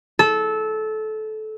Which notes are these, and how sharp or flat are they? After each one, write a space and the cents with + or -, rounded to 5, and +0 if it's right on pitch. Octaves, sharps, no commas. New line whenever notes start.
A4 -20